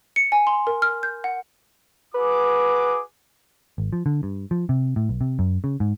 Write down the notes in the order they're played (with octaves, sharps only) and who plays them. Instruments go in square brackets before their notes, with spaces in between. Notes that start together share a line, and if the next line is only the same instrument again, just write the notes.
[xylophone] C#7
G#5
C6
A#4
F6
G6
F#5
[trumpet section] F#4 G#4 D6 [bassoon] B4
[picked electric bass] G#1
F3
D3
G2
F3
C3
A2
B1
C3
F#2
C#3
G#2